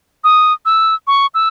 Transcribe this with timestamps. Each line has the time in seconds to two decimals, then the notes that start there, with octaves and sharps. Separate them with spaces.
0.24 D#6
0.66 E6
1.07 C#6
1.35 E6